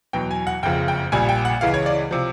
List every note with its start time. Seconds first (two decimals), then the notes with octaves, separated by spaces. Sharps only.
0.13 E2 B2 F#3 G5
0.31 G#5
0.47 F#5
0.63 F#1 F2 C#3 F3 G5
0.88 G5
1.12 A#1 A#2 G3 G#5
1.29 G5
1.45 F#5
1.61 C#2 C#3 E3 F5
1.74 C#5
1.86 D5
2.11 C3 F3